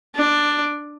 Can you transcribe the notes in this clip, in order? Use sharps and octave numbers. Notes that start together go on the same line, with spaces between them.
D4